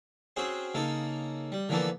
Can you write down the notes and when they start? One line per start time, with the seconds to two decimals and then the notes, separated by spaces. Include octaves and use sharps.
0.36 C4 C#4 F#4 G#4 C5
0.74 C#3 A#3 D#4 A4
1.52 G3
1.69 D3 E3 F3 A#3 B3 A4